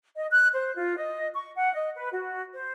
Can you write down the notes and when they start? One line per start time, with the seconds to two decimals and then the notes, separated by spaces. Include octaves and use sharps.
0.16 D#5
0.32 F#6
0.53 C5
0.76 F4
0.98 D#5
1.34 C#6
1.55 F#5
1.74 D#5
1.96 B4
2.12 F#4
2.54 C5